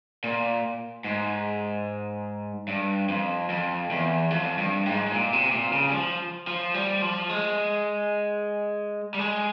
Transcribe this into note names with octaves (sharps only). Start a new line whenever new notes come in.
A#2
G#2
G2
F2
F2
E2
F2
G2
G#2
G#2
A#2
C3
A#2
C#3
G3
F3
F3
G3
F3
G#3
G3
G#3